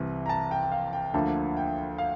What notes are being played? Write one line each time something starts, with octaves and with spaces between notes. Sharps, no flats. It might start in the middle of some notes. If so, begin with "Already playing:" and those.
Already playing: C2 C3 E3
A#5
A5
G5
G5
F5
G5
D2 D3 F3 A#3 A5
G5
F5